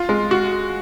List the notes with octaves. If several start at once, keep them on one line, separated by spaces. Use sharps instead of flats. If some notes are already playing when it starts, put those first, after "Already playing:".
Already playing: F4
G#3
F#4